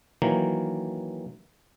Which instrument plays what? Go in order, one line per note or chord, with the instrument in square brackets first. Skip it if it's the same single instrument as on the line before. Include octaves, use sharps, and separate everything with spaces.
[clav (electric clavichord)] D#3 E3 F#3 A#3